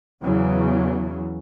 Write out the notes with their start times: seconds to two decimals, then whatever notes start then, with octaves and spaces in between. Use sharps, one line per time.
0.23 E2 C#3 E3 F#3